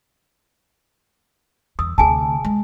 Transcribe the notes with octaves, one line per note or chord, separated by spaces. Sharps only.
E2 D#6 E6
D2 C3 G#4 G#5 A5
G#3